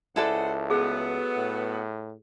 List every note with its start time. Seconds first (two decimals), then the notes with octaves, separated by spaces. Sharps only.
0.16 C#2 G#3 E4 A4 C5 D5 F#5
0.70 F#3 A3 B3 G#4
1.37 A2